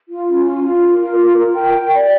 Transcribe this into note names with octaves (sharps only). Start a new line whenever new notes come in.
F4
C#4
F4
F4
A#4
F4
A#4
A#4
G5
G5
D5